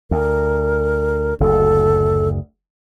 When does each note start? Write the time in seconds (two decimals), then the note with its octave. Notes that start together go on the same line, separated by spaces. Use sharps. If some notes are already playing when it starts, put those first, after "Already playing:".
0.11 D2 A#4
1.40 F#1 D2 A4